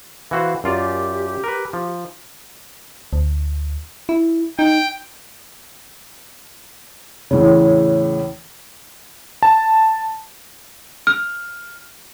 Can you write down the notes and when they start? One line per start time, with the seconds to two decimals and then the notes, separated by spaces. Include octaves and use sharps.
0.31 E3 F#4 C5 F5
0.64 F#2 F4 G4 D5
1.44 A#4 B4
1.73 F3
3.13 D2
4.09 E4
4.59 D#4 G5
7.31 E2 A2 C#3
9.43 A5
11.07 F6